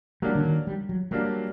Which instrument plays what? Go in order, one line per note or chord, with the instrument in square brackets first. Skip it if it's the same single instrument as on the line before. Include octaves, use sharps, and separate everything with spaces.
[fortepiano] F#3 A#3 D4 [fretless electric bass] G3
[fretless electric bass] D3
D#3
G3
F#3
[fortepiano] F#3 A#3 D4 [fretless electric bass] G3